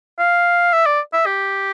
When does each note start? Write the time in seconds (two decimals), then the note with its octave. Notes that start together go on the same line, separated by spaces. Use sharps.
0.19 F5
0.73 E5
0.86 D5
1.13 E5
1.26 G4